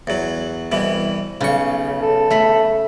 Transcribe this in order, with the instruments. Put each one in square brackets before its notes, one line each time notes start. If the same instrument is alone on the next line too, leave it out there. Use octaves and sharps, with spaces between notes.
[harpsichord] E2 F#3
C2 B2 E3
[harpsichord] B1 C#6 [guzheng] C#3
[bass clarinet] A4
[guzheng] A3 B5